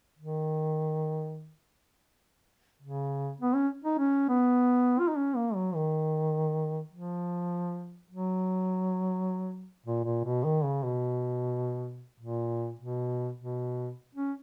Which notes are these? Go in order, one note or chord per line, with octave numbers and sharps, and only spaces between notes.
D#3
C#3
B3
C#4
D#4
C#4
B3
F4
D#4
C#4
A#3
F#3
D#3
F3
F#3
A#2
A#2
B2
D#3
C#3
B2
A#2
B2
B2
C#4